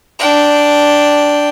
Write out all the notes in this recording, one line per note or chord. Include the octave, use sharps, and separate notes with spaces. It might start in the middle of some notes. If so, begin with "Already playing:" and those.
D4 G5